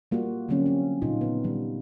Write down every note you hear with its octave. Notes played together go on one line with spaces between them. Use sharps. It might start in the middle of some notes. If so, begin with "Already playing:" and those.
G3 A#3 F4 F#4
D3 F#3 G3 A#3 C4 C#4
C#4
A#2 C#3 D#4 F4
B3
D#3 G3